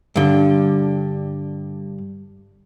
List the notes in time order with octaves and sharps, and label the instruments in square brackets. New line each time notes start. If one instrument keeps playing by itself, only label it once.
[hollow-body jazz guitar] G2 D3